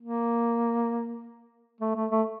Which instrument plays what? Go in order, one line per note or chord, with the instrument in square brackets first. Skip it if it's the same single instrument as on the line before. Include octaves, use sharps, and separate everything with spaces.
[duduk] A#3
A3
A3
A3